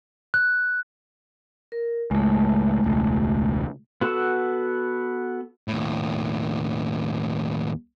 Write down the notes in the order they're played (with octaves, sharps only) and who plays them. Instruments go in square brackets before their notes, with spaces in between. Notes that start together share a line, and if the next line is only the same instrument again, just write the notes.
[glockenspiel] F#6
[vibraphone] A#4
[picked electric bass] C#2 A2 [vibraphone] G#3 A3
[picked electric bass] E1 C#2
[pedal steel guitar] B3 F#4 A4 F#5 E6
[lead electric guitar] D#2 A2